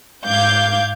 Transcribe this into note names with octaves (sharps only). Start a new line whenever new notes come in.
G#2 F5 D6 G6 G#6